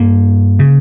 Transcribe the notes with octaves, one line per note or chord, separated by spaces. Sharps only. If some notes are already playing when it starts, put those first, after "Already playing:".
Already playing: G2 A#3
C#3